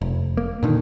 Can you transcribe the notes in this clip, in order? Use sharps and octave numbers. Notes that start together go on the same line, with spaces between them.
F1
A#3
A#2 D3 D#3